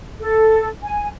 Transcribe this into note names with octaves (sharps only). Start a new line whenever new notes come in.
A4
G#5